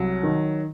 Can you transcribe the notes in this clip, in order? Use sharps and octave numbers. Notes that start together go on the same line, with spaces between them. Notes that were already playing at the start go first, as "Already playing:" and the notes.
Already playing: C2 F#3
D#3